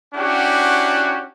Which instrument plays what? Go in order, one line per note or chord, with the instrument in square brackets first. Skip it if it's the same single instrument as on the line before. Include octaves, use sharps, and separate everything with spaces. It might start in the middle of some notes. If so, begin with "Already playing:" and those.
[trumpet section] C#4 D4 E4 F#4 G4 F#5